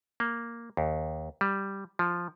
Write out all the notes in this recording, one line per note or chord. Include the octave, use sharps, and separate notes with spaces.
A#3
D#2
G3
F3